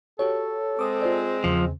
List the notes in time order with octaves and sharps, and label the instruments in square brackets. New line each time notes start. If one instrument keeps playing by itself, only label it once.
[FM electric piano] F#4 G4 C#5 [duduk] A4
[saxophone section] G#3 C4 [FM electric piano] D6 D#6
[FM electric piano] F4 C5 D5
[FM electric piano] E2 C#3 [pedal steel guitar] F3